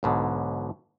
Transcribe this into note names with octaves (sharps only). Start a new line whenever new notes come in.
B1 G#2 B2 D3